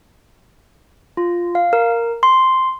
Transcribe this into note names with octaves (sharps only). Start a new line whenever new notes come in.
F4
F5
A#4
C6